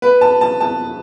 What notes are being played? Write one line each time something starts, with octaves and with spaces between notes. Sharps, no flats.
B4
A5
A5
A5